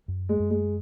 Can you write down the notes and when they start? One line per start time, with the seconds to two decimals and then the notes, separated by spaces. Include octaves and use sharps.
0.08 F#2
0.29 G#3
0.40 F#2
0.50 G#3